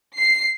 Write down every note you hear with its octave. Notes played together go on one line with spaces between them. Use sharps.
C7